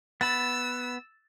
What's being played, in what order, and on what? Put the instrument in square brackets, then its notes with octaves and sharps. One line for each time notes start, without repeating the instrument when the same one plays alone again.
[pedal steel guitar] B3 B5 [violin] E6 [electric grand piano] A6